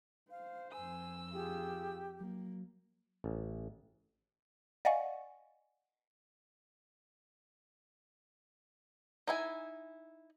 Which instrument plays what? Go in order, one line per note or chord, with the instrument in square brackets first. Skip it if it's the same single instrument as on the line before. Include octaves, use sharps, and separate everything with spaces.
[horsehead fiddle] C5 [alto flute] F5
[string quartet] F2 E6 [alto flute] G#5
[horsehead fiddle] F4 G#4 [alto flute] G4
[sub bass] F#3 [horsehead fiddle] A#3
[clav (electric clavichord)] A1
[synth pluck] D5 D#5 F5 F#5 G#5 C#6
[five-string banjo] D#4 E4 G#5